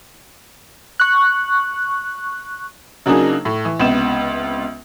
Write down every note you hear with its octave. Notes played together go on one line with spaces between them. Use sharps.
C#6 F#6
C#3 F#3 A#3 D4 D#4 G#4
A2
E3
C#2 C3 B3 E7